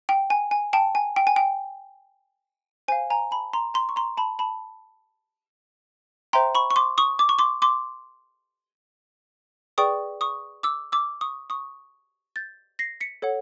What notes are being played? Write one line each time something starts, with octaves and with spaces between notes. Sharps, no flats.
G5
G#5
G#5
G5 A5
G#5
G5
G#5
G5
C5 F5 G#5
G#5 A#5
A5 B5
A#5 C6
A#5 C6
C#6
A#5 C6
A5 B5
A5 B5
C5 E5 G5 A#5 C6
B5 C#6
C#6
C6 D6
C#6 D#6
D6
C#6
C6 D6
C6 D6
G#4 B4 D5 G5 C#6 D#6
C#6 D#6
D6 E6
D6 E6
C#6 D#6
C#6 D#6
G6 A6
A#6 C7
B6 C#7
A4 C#5 F#5